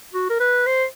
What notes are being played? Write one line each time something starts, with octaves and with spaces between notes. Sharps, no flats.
F#4
A#4
B4
C5